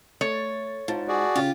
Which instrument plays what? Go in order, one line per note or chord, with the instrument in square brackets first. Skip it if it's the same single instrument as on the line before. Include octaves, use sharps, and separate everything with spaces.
[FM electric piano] A3 A6 [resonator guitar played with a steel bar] C#5
[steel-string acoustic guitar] G#2 [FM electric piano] F4 A5
[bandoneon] F#4 G#4 D5
[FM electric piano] C#3 C#4 [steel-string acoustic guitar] F4 G4